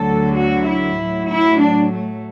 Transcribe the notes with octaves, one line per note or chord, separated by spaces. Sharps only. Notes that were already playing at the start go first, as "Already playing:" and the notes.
Already playing: D2 D3 F#3 A4
F#4
E4
A2 F#3
E4
D4
A3